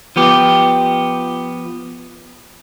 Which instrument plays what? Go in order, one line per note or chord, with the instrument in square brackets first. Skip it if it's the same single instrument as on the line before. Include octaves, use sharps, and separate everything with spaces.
[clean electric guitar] F3 B3 G4